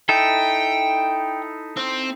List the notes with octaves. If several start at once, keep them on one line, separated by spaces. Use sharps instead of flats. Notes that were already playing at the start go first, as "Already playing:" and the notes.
D#4 E4 A4 G5
C4